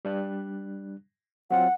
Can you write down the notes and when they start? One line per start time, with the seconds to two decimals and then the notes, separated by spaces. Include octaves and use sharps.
0.05 G3 D4 F#6
1.51 F#3 C4 F4 F#5